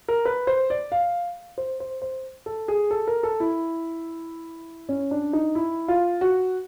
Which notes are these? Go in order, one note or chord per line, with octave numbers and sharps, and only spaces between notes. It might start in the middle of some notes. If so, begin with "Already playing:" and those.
A#4
B4
C5
D5
F5
C5
C5
C5
A4
G#4
A4
A#4
A4
E4
C#4
D4
D#4
E4
F4
F#4